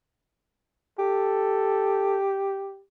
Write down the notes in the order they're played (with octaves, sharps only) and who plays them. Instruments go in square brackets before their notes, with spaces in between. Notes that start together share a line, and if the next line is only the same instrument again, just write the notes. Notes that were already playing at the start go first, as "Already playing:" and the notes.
[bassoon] G4 [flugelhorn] A4